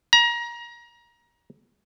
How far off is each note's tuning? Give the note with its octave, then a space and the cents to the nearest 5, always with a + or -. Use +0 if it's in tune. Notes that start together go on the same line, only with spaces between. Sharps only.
A#5 +25